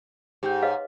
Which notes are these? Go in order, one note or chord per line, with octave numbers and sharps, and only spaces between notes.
G#2 G4 G5 G6
G#4 B4 C#5 D#5 F5